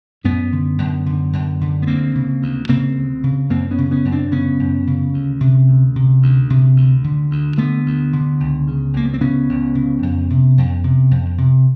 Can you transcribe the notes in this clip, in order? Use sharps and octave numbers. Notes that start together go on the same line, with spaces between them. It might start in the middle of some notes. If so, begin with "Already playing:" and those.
F#2 B3 C#4
D3
F#2
D3
F#2
D3
B3
D2 A#3 C4
C#3
D2
C#3 A#3 C4
D2
C#3
F#2 A#3 C4
B3 C#4
C#3
B3 C#4
F#2
C4 D4
C#3 B3 C#4
F#2
C#3
D2
C3
D2
C3
D2
C3
D2
D3
D2
D3 A3 B3
D2
D3
C#2
C#3
C#2 A#3
B3
C4
C#3 B3 C#4
C#2
C#3
F2
C3
F2
C3
F2
C3